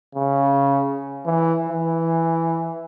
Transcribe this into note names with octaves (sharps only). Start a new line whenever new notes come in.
C#3
E3
E3